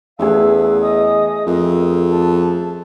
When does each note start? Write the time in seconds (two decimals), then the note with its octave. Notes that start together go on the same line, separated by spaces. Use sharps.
0.19 E2 A3 C#4 G#4 B4 F5 E6
0.81 D#5 G#5 D#6
1.46 F2 G4 A#4
2.08 A5